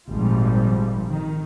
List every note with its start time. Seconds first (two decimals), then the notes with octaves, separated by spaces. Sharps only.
0.10 G#1 A#2 F3 G3
1.07 D#3